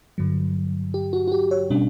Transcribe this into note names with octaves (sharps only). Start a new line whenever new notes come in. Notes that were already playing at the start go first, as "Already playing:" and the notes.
G2 D3 F#3
G4
F#4
F#4
G4
C#5
B2 G3 C#4 D4